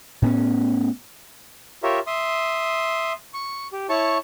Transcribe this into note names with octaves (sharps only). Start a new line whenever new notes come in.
A2 B3 C#4
F4 G4 A#4 C#5 E5
E5 C6 D#6
C#6
G4
E4 C#5 A5 C#6